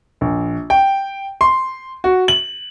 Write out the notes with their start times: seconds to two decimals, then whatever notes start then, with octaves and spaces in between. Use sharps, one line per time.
0.21 A#1
0.70 G5
1.41 C6
2.04 F#4
2.28 F#7